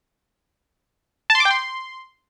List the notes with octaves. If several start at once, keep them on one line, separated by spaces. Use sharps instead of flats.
A5
C6
D6
G5
C6